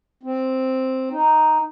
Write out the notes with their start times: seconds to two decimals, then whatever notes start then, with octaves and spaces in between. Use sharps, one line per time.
0.23 C4
1.11 D#4